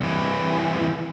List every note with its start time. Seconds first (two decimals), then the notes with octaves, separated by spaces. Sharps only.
0.01 C2 E3